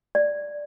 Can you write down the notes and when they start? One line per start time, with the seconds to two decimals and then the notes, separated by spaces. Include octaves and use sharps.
0.15 D5